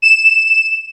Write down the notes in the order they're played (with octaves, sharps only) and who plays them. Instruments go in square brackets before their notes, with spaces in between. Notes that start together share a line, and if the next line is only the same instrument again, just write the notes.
[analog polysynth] E7